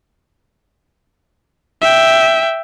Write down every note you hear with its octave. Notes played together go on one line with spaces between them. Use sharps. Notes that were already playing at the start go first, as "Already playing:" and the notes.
E5 G5